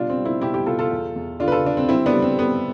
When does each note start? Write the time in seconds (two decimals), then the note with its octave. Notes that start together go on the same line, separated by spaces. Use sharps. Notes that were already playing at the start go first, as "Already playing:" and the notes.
Already playing: B2 G3 D4 F4
0.10 C4
0.17 G3
0.25 C4 E4
0.41 B2 E4 G4
0.54 E4 G4
0.66 B2 F4 A4
0.79 F4 A4
0.91 E2
1.16 E2
1.40 D3 D4 F4
1.48 B4
1.52 F4 A4
1.65 D3 D4
1.77 C4
1.89 G3 C4 E4
2.06 B3 D4
2.13 G3
2.22 C4
2.38 F2 B3